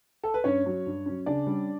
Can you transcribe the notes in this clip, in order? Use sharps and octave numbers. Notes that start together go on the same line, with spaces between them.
A4
B4
G2 C#4 C#5
F#3 C#4
G2
F#3 C#4
C#3 D4 D5
G3 C#4